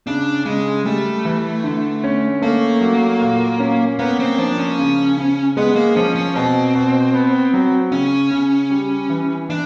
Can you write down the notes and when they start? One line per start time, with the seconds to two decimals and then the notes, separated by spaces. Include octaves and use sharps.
0.07 C#3 D4
0.45 C#3 G#3
0.85 G3 A3
1.25 E3
1.64 D3
2.04 C#4
2.42 A3 A#3
2.81 F#3
3.21 A#2
3.60 C#4
3.99 A#3 B3
4.20 C4
4.38 F3 D4
4.58 C#4
4.78 C#3
5.17 C#3
5.57 G#3 B3
5.76 A#3
5.96 F3 C#4
6.15 C#4
6.35 B2 C4
6.75 B2
7.13 B3
7.53 F#3
7.92 C#3 C#4
8.31 C#3
8.71 G3
9.09 E3
9.49 E3 D4